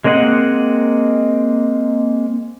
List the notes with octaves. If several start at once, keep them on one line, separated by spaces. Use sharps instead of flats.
G#3 A#3 C4 D#5 F#5